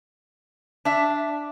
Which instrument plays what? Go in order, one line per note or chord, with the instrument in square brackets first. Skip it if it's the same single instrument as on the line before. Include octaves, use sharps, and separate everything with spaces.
[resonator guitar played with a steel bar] D4 E5